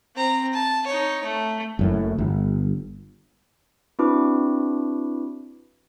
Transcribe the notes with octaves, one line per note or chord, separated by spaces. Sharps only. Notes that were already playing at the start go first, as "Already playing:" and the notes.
C4 A#5
A5
D#4 C#5
A3
F#1 F#2 A2
G1
C4 D4 E4 F#4 B4 D6